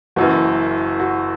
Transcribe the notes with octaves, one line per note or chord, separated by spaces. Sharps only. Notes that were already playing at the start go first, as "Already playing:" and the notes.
F#1 F#2 E3 F#4
F#4